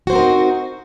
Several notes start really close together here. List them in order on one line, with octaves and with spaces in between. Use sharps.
F#4 C5 C4 A#4 D#4